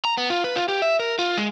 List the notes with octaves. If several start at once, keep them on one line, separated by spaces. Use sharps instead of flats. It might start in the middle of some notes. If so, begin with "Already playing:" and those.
A#5
B3
F4
B4
F4
G4
E5
A#4
F4
G#3